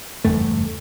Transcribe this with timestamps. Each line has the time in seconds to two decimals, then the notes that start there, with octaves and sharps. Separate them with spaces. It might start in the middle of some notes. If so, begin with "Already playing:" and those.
0.25 F#1 E2 G2 A3